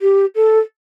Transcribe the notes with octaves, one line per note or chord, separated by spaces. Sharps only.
G4
A4